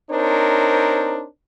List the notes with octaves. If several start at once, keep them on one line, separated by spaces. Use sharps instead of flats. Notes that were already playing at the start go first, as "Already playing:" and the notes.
C4 D4 D#4 A#4 C5 C#5